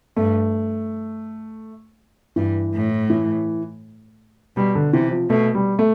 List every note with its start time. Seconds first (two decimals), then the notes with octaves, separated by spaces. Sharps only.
0.16 G2 A3
2.36 G2 E3
2.74 A2
3.10 E3
4.56 B2 G3
4.75 D3
4.93 C3 E3
5.11 F3
5.30 B2 A3
5.55 G3
5.79 A3